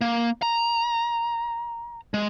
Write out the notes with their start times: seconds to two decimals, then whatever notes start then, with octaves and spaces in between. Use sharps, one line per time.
0.01 A#3
0.42 A#5
2.14 G#3